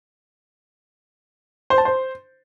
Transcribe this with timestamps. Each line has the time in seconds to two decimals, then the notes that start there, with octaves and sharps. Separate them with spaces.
1.70 C5
1.78 A5
1.85 C5